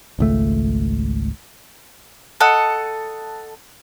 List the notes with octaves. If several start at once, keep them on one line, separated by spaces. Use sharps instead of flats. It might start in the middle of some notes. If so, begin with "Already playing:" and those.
G#1 C#2 A3
A4 D#5 F#5